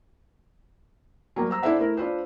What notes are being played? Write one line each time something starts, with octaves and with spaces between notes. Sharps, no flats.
F#3 G3 A#3
C5 A#5 E6
D4 E4 A4 C5 E5 F#5
A3 E4 A#4
D4 F4 B4 C5